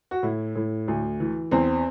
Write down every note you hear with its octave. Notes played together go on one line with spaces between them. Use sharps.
F#4
A2 E4
A2
D2
E3
E2 C4